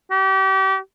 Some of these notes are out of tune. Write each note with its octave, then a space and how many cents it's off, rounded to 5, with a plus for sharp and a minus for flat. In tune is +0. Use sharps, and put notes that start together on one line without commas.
G4 -35